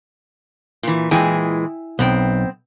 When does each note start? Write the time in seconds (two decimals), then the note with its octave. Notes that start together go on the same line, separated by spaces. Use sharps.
0.83 A#2 E3
1.11 A#2 E3 G#3 E4 G5 G#5
1.99 B1 B3 C4 G5